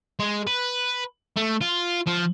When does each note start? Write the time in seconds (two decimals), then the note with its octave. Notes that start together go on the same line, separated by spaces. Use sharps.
0.19 G#3
0.47 B4
1.36 A3
1.61 F4
2.06 F3